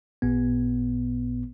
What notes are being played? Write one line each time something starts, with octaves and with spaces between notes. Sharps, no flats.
A1 A#2 B3